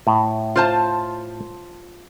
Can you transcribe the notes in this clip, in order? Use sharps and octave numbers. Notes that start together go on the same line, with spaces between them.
A2
F4 C5 A5